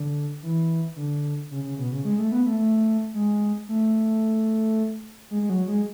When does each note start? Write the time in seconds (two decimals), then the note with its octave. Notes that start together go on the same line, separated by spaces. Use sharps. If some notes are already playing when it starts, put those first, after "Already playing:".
Already playing: D3
0.43 E3
0.96 D3
1.51 C#3
1.64 C#3
1.78 B2
1.92 C#3
2.05 G#3
2.18 A3
2.32 B3
2.46 A3
2.59 A3
3.14 G#3
3.69 A3
5.31 G#3
5.42 G#3
5.50 F#3
5.68 G#3